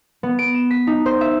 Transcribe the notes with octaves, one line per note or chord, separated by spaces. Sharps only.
B3
D7
E7
B6
D#4
C5
E5